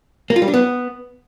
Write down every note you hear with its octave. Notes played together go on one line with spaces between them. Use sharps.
A#3
F4
G3
D4
B3